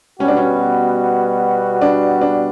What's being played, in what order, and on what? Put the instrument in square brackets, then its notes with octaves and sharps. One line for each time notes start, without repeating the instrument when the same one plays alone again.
[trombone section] B2 G3 B3 F#4 [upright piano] C#4
[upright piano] D4
C#4
D4
D4